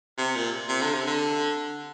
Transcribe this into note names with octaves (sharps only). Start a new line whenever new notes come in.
C3
A#2
C3
D3
C3
D3